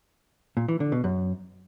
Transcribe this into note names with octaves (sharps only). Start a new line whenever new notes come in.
A#2
E3
D3
B2
F#2